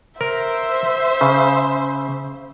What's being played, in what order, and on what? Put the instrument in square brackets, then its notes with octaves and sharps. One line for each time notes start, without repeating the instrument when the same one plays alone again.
[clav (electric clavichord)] A#4 [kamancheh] C5 E5
[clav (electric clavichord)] C#3